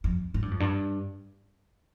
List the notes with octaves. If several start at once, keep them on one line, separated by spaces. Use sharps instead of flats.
F2
G#2
G2
F2
G2